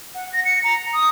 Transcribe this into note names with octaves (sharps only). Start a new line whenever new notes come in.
F#5
A#6
C#7
A#5
D#6